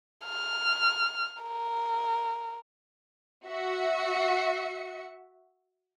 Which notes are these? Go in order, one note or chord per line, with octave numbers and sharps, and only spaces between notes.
F6
A#4
F#4 E5 C#7